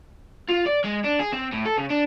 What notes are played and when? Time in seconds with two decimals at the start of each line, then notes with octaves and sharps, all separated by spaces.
0.48 F4
0.66 D5
0.84 G#3
1.04 D4
1.19 G#4
1.32 C4
1.52 A2
1.65 A4
1.78 C#3
1.90 D4